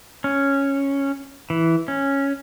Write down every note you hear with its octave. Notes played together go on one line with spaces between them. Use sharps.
C#4
E3
C#4